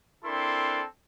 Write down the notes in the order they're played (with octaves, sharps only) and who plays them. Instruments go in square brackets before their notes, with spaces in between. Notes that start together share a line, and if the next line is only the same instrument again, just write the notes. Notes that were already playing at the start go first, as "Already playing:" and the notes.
[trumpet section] C4 D4 E4 A4 A#4 C6